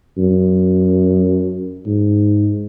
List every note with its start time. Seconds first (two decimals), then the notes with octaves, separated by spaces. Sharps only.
0.18 F#2
1.86 G#2